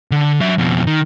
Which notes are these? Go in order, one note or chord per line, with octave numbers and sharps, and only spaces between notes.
D3
F#3 E5
F2 B2
D#3